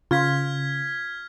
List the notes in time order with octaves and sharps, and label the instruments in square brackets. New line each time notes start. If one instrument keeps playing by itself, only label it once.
[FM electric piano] C#3 [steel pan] F4 [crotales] F6 G#6 B6